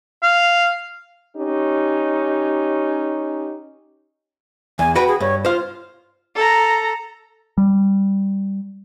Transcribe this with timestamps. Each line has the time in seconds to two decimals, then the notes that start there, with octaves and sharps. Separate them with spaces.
0.23 F5
1.36 C#4 D#4 G4
4.79 E2 G#5
4.95 F#4 B4 G5 B5
5.08 G#4
5.20 G2 C#5
5.45 F4 C5 F5
6.35 A4 A#5
7.58 G3